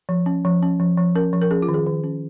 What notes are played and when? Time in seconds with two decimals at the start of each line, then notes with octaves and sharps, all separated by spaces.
0.09 F3
0.26 C#4
0.45 F3
0.63 C#4
0.80 F3
0.97 F3
1.15 C#4 A#4
1.33 F3
1.42 A#4
1.51 C#4 G#4
1.62 F4
1.69 D#3
1.74 G#4
1.86 D#3
2.04 C#4